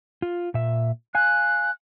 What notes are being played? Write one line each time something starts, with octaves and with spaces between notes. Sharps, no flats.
F4
A#2 E5
F5 G#5 F#6